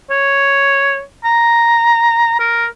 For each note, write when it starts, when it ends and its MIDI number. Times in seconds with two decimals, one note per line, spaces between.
0.10 1.02 73
1.24 2.38 82
2.39 2.66 70